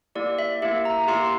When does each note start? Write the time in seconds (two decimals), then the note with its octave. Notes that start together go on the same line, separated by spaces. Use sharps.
0.15 A#3 E4 G4 D5
0.39 E5
0.62 A#3 E4 G4 E5
0.85 A#5
1.08 A#3 E4 G4 C6